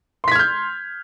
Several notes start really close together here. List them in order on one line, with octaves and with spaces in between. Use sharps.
C6 B6 G#6 F6 G6